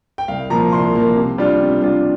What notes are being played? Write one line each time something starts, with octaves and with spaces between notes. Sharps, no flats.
G5
C2 F5
A#2 F3 A#3 A#5
C2 C6
A#2 F3 A#3
C3
G3 D4 F4
C3
G3 D4 F4